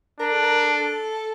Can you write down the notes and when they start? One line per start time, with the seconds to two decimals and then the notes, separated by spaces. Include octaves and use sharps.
0.20 D4 A#4
0.32 A4
0.42 A#4
0.63 A4